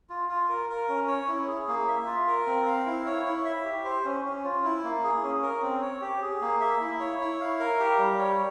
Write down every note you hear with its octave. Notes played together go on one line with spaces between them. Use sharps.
F4
F4
A#4
A#4
C#4
C#5
E4
G#4
A#3
E5
F4
A#4
C4
F5
E4
C#5
E4
E5
G4
C5
C#4
C#4
F4
E4
A#3
G#4
C#4
A#4
C4
C#5
G4
G#4
A#3
E5
E4
C#5
E4
F5
A#4
G4
G3
C#5